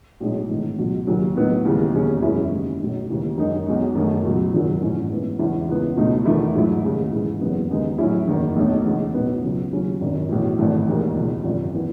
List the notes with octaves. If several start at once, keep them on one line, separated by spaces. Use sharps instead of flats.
B1 A2 G#3 D#4
G#1 G#2 E3 A3 D#4
C#2 B2 F#3
D#2 C#3 F#3 C#4
A2 F#3 B3 D#4
D#2 C#3 E3 G#3
E1 D#2 C#3 G#3 C#4
F#2 E3 G#3 C#4 E4
D#2 C#3 G#3 D#4
B1 B2 A3 D#4
D#2 C#3 E3 G#3
F#2 D#3 G#3 D#4
B1 B2 G#3 D#4
F#2 D#3 A3
C#2 B2 F#3
G#1 F#2 D#3 F#3
A1 G#2 E3 G#3 C#4
G#2 E3 B3
E2 C#3 G#3 C#4 E4
C#2 C#3 E3 B3
C#2 B2 A3 D#4
E2 D#3 A3 E4
G#2 F#3 A3 E4
D#2 C#3 G#3
G#2 E3 G#3 D#4
F#1 E2 C#3 F#3 B3
D#2 C#3 G#3 B3 D#4
A2 F#3 C#4 E4
F#1 E2 D#3
B1 B2 A3 D#4
E2 C#3 G#3 D#4
B1 A2 E3 B3 D#4
C#2 C#3 F#3 C#4
D#2 C#3 F#3 C#4
G#1 F#2 D#3
B1 A2 E3
G#1 G#2 E3 A3
E1 D#2 D#3 G#3
C#2 B2 G#3
G#1 F#2 C#3 F#3
E3 B3